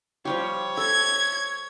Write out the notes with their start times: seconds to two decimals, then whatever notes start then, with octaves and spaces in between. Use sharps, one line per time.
0.25 F3 G3 G4 C#5
0.77 A4 G#6